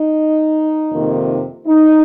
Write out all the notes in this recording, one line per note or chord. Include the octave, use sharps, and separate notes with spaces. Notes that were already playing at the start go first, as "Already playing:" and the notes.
Already playing: D#4
F2 C3 D#3 A#3
D#4